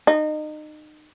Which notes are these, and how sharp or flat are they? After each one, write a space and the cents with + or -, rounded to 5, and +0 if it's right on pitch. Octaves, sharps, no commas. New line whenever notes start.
D#4 -30